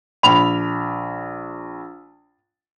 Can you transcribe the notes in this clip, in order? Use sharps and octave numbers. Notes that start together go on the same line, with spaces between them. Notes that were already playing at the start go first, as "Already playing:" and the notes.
A#1 B5 F7